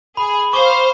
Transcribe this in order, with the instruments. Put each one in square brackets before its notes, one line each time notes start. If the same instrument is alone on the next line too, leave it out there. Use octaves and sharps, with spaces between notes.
[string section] G#4 [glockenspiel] B5
[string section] C5 F5 [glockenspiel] C#6 D6 G7